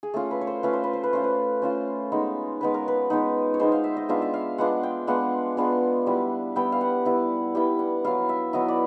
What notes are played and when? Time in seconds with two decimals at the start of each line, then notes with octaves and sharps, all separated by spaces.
0.03 G#4
0.14 A3 C#4 F4 A4
0.31 B4
0.41 C#5
0.47 C5
0.63 A3 C#4 F4 B4
0.73 C5
0.84 B4
0.93 C5
1.03 B4
1.13 A3 C#4 F4 C5
1.24 B4
1.62 A3 C#4 F4 C5
2.12 G#3 B3 D#4
2.61 G#3 B3 D#4 B4
2.74 A#4
2.88 B4
3.10 G#3 B3 D#4
3.54 C#5
3.60 G#3 B3 D#4 C5
3.72 F5
3.84 E5
3.97 D#5
4.09 G#3 B3 D4 F4 E5
4.22 E5
4.34 F5
4.58 G#3 B3 D4 F4 F#5
4.83 G5
5.07 G#3 B3 D4 F4 F#5
5.57 G#3 B3 D4 F4
6.07 G3 B3 E4
6.56 G3 B3 E4 G5
6.72 F5
6.81 F#5
7.05 G3 B3 E4
7.55 G3 B3 E4 G5
7.79 F#5
8.04 F#3 B3 E4 F5
8.29 E5
8.53 F#3 B3 E4 D#5
8.68 D5